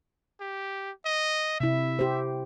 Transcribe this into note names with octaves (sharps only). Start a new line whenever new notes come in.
G4
D#5
C3 E4 E5
G4 C5